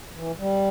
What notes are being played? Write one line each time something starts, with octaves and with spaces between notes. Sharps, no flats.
E3
G3